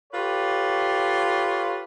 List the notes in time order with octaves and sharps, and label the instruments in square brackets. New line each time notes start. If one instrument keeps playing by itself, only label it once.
[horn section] F4 G4 A4 B4 C#5